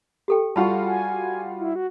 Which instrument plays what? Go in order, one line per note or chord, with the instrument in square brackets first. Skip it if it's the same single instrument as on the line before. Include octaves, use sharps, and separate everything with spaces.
[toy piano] G4 A4 G5
[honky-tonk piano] G3 F4 F#4 [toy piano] A5 B5 C#6
[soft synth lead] G#5
E4
F#4